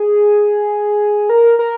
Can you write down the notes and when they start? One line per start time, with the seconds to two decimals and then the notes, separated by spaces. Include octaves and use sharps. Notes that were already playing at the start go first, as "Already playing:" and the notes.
Already playing: G#4
1.30 A#4
1.59 A#4